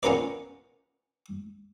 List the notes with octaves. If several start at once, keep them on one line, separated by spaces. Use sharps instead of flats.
B3 C#4 F4 A#4 B4 D5